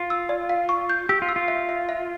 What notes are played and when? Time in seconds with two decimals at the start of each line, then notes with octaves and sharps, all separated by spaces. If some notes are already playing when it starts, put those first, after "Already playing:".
Already playing: F4
0.10 E6
0.29 D5
0.49 F5
0.69 C#6
0.90 G6
1.09 G4 E6
1.22 F4
1.29 E6
1.36 F4
1.48 E5
1.69 E5
1.89 E5